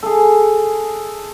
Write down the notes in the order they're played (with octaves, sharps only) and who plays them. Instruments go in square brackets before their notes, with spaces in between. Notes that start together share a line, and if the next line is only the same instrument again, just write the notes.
[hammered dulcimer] G#4 A4